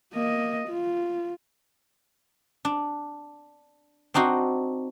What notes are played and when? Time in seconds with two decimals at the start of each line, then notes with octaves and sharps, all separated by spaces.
0.14 A#3 D#5
0.69 F4
2.65 D4
4.14 C4 D4 D#4 F#4 C5